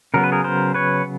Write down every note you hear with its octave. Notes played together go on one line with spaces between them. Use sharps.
C#3 F#3 B3 A#4
B4
G#4 A#4
A#4 C5
B4 C#5